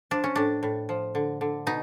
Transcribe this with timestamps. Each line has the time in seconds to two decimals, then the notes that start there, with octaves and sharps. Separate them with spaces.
0.11 F3 D4
0.24 C#4
0.35 A2 D4
0.63 A2
0.89 F3
1.15 D3
1.41 D3
1.67 B2 D#4